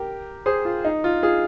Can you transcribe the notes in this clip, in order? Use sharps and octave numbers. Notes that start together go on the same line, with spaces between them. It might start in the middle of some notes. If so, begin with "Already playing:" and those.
Already playing: G4 A#4
G#4 C5
F4
D#4
F4
F4 G#4